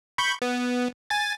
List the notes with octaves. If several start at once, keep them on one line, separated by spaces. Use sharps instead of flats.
B5 C#6 G6
B3
G#5 A6